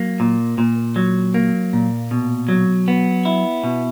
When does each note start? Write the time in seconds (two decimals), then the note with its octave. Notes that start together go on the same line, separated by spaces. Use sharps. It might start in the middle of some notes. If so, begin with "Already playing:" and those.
Already playing: F#3 A#3
0.20 A#2
0.58 A#2
0.96 F#3
1.34 A#3
1.73 A#2
2.11 B2
2.49 F#3
2.88 B3
3.25 E4
3.64 B2